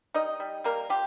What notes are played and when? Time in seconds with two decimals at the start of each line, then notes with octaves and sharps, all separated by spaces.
0.14 G3 D#4 D#5
0.40 G3
0.64 G3 A#3 A#4
0.90 F4 G4